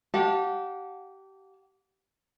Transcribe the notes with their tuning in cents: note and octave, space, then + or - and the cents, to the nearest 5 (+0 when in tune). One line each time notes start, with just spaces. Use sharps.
G4 -25 F#5 -40 A5 +5